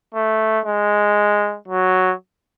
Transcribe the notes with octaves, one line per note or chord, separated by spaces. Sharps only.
A3
G#3
F#3